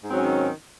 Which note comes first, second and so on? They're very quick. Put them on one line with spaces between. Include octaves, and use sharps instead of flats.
G#2 C4 F#3 C#4 D#3